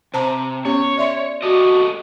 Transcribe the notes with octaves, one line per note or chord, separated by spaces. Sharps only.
C3 C5 A5 A#5
B3 C#4 G4 C#5
D5 E5 C6
F#4 G4 A4 D#5